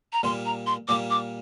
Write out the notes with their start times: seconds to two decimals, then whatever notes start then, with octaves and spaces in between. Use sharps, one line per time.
0.13 A#5
0.23 A#2 G3 A#3 C6
0.45 A#5
0.67 C6
0.88 A#2 G3 A#3 D6
1.10 D6